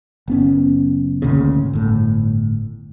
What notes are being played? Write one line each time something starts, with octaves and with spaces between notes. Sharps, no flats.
F#1 B3 C#4
G#1 D2 A#2 C#3
G1 A2